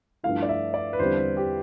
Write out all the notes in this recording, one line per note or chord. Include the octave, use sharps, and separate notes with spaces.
G2 F3 A3 E4 F5
D5
E5
D5
B4
E2 D3 G3 C4 C5
B4
G4